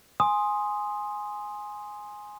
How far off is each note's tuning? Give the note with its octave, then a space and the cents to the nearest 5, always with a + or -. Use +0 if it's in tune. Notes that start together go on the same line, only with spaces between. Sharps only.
G#5 +0 C6 +5 D#6 +0